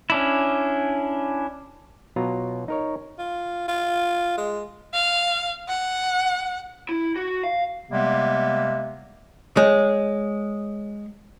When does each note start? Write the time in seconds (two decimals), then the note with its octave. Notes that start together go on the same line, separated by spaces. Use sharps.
0.10 C#4 D4 E4
2.16 B2 F#3 F4 A#5
2.68 D#4 A#4 C#5
3.19 F4
3.68 F4
4.38 G#3
4.94 F5
5.68 F#5
6.89 E4
7.16 F#4
7.44 F5
7.91 C3 G3 G#3 A#3 B3
9.57 G#3 C#5